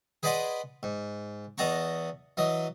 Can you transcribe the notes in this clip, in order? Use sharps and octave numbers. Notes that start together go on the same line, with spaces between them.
G#4 B4 D5 D#5 F#5 C6
G#2
E2 D#5 F#5 A5 A#5 C#6
E3 F#3 D#5